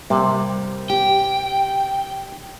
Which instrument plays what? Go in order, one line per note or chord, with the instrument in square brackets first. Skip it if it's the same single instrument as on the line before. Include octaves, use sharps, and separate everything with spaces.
[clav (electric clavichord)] C3 [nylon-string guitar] G3 A#3
[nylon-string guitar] G4 [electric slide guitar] G5